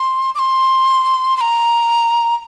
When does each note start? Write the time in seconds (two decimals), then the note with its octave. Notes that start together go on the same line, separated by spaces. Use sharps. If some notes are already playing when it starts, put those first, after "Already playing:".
Already playing: C6
0.35 D6
0.39 C6
1.37 C6
1.41 A#5